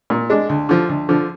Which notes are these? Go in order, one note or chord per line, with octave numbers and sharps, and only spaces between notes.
A#2
G#3 D4
D2
D3 F3
D2
D3 F3